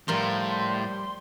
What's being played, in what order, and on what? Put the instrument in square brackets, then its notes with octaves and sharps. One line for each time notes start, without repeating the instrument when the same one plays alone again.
[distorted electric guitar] A2 [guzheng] F3 A#4 [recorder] G3 [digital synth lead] C6